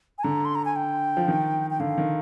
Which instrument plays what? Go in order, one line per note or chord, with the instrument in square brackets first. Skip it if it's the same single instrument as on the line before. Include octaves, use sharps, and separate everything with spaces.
[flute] G#5
[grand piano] D3 [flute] A#5
[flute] C6
A#5
G#5
G5
[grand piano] F3
D#3
[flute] G5
[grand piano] D3 [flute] F5
[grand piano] D#3